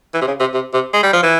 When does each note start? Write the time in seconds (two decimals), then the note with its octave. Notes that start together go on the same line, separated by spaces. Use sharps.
0.14 E3
0.22 C3
0.28 C#3
0.40 C3
0.54 C3
0.73 C3
0.94 G#3
1.03 G3
1.13 F3
1.23 E3